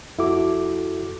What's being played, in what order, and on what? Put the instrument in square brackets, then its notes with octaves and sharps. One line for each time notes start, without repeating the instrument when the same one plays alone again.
[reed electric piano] F2 E4 F#4 A4 D6